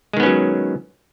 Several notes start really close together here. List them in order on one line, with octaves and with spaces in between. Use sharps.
G#3 D#3 B3 C#4 F#3